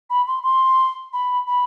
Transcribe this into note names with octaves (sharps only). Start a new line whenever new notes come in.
B5
C6
C6
B5
B5